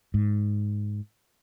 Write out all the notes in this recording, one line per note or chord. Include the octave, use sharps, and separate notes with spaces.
G#2